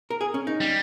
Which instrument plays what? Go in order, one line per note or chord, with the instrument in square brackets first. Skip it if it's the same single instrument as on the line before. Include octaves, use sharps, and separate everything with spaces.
[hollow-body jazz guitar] A#4
G#4
C#4
D#4
[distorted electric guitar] G3